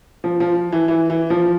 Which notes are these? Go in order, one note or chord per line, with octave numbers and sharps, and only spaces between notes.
F3
F3
E3
E3
E3
F3